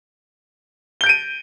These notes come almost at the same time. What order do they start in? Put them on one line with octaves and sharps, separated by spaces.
G7 G6 D7 D#7